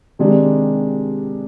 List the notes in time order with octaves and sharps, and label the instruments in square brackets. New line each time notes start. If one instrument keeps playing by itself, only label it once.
[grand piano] C3 D#3 G#3 D4 G4